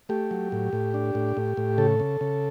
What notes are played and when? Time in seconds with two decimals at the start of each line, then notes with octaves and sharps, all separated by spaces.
0.09 A3 G4
0.31 F#3
0.52 A2
0.73 A2
0.94 D4
1.15 A2
1.37 A2
1.57 A2
1.78 C#3 A4
2.00 C#3
2.21 C#3